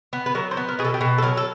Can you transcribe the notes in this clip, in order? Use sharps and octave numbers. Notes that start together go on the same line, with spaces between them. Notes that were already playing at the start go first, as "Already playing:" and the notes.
B3
B4
F#3 A#4
C5
B3
A#4
B2 G#4
A4
G4
B2 G#4
A4
F#3 A#4
A4